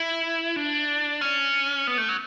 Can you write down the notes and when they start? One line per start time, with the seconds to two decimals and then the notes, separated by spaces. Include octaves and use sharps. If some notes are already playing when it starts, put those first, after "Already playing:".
Already playing: E4
0.56 D4
1.21 C#4
1.87 B3
1.98 A3
2.09 F#3